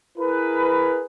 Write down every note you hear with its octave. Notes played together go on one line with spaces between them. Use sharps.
E4 G#4 A#4 B4